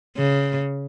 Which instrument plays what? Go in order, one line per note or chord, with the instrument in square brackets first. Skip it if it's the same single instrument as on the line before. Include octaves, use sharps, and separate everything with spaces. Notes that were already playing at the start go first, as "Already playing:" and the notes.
[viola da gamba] C#3